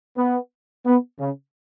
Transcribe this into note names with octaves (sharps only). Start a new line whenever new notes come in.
B3
B3
C#3